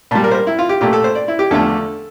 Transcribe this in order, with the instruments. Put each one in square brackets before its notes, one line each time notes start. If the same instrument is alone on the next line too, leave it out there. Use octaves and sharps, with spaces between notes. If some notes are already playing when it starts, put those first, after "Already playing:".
[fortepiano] A#2 G3 A5
A#4
C5
A#4
E4
F4
G4
A#2 A3 G4
A4
C5
D5
E4
G4
E2 D3 F3 A3 A4